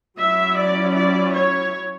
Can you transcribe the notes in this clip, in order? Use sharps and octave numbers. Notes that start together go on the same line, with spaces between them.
F#3 C#4 E4 E5
D5
D5
C#5